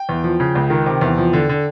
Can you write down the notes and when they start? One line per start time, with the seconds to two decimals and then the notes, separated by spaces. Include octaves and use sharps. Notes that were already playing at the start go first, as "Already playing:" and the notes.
Already playing: G5
0.09 E2
0.24 F3
0.40 C#3
0.55 C#2
0.70 D#3
0.86 C3
1.01 E2
1.18 F3
1.33 D3
1.49 D3